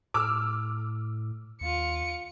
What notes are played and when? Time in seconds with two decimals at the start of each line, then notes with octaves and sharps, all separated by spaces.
0.14 A2 D6 E6 F6
1.61 D#2 F4 C#7